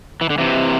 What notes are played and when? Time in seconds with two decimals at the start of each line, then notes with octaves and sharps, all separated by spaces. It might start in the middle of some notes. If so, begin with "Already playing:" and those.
0.21 E3
0.30 D3
0.38 C3 E3